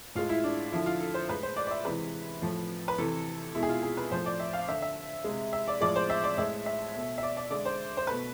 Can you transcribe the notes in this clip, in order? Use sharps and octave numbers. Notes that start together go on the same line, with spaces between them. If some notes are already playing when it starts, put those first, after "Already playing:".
A2 G#3 F4
E4
D4
D3 F3 A3 E4
F4
A4
C5
A2 G#3 B4
C5
D5
D5
E5
C3 E3 G#3 B4
A2 F3 A3
B4
C3 E3 A3 A4
B2 G#3 E4
G#4
F4
G#4
B4
A2 F3 A3 C5
D5
E5
F5
D3 A3 E5
E5
C3 G#3
E5
D5
A2 F3 G#3 D5
C5
E5
D5
A2 G#3 E5
E5
B2 A3
E5
D5
D5
D3 G#3 D5
C5
C5
B2 A3 B4